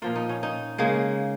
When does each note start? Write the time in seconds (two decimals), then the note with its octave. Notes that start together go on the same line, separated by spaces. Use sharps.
0.02 A#2 F3 A#3 F4
0.16 D#4
0.29 C#4
0.43 D#4
0.78 C#3 G#3 A#3